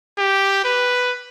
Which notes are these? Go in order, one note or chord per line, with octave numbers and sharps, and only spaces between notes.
G4
B4